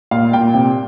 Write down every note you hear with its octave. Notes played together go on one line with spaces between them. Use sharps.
A#2 F5
A#2 G5
C3